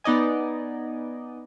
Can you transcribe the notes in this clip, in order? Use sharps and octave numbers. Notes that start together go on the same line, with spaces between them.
B3 D#4 D5 D#5 G#5